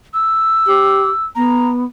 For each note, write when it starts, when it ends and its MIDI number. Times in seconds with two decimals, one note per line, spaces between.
0.14 1.25 88
0.66 1.09 67
1.35 1.83 59
1.35 1.69 82